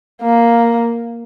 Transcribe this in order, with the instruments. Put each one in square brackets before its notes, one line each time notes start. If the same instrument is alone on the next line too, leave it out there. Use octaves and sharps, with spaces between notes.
[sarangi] A#3